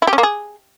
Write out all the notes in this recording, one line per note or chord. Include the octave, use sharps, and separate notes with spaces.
E4
G4
C#4
A#3
G#4